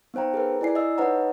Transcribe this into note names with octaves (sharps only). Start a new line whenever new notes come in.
B3 D#4 C5 G5 A#5
G#4 A#4 B4
E4 D5 G#5 C7
D#5 E6
D#4 B4 C#5 D#5 F#5 A#5